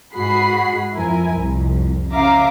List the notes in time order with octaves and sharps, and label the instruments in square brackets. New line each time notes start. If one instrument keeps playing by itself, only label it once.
[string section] G#2 F#4 G#4 F#5 B5 C7
F2 F3 E4 A#4 G#5
C2 F2
C#3 E5 F5 A#5 D6